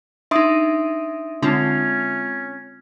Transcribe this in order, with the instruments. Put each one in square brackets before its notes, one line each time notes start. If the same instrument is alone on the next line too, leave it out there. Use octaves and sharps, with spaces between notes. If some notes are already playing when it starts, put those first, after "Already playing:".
[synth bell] D4 D#4 [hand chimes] E5 C6 D#6
[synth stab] D3 [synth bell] G#3 C4 F4 [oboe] C#4